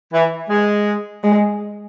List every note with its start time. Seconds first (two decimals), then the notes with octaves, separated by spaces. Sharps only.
0.13 E3
0.50 G#3
1.24 G#3